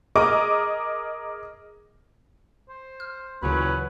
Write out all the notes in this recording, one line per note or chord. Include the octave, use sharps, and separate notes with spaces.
G#4 A#4 D#5 D6
C5
F6
D2 A#2 C#3 E3 F#3 C#4 B4